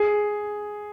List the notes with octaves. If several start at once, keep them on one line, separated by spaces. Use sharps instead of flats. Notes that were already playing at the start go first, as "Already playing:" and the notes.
Already playing: G#4